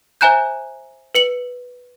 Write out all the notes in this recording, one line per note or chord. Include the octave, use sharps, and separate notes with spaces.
C5 E5 G#5 A#5 F#6 G6
B4 C#7 F#7